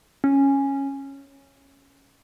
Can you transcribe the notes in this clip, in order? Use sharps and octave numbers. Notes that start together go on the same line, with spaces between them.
C#4